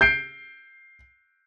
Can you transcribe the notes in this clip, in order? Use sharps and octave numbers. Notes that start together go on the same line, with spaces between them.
G6 C7 D7